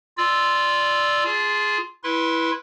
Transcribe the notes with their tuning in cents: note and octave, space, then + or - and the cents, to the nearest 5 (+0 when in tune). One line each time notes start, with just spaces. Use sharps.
F4 -5 D5 +0 E6 +0
F4 +0 G#4 +0 G#5 +45
E4 +0 B4 -15 C6 +20